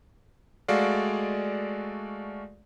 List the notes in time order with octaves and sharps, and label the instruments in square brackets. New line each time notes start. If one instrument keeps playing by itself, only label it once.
[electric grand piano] G#3 A3 F#4 D5 F5